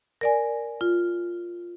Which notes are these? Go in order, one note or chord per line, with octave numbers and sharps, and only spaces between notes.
A#4 D5 G#5
F4